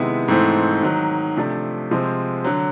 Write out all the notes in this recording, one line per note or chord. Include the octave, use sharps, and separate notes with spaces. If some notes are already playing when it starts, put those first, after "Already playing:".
Already playing: C3 D#3 G#3 B3 E4
G#2 E3 A3 C4
G#2 D#3 F#3
C3 F3 A3 D4
C3 F3 G#3 C4
D3 F#3